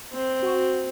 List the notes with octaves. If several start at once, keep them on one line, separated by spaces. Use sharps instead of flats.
C4
F#4